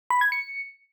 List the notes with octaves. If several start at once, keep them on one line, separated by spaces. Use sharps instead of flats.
B5
G#6
C#7